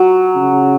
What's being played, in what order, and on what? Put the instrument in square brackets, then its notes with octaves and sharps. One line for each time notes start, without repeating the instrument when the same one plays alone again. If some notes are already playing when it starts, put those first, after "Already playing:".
Already playing: [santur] F#3
[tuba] C#3